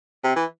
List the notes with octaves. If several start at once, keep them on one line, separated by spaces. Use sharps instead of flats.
C3
E3